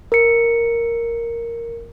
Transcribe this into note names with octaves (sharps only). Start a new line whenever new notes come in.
A#4 C#7